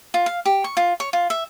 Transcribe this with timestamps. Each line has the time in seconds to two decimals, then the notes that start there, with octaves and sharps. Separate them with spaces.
0.14 F4
0.26 F5
0.45 G4
0.64 C#6
0.77 F4
1.00 C#5
1.13 F4
1.30 E5